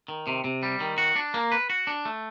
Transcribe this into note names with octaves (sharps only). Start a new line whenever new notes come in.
D#3
C3
C3
G3
D#3
F#4
D4
A#3
B4
F#4
D4
A3